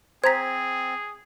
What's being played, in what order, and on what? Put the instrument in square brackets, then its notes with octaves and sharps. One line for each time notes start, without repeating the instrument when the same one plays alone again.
[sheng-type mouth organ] C4 [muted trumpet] G#4 [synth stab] C5 A#5 [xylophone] G#6 B6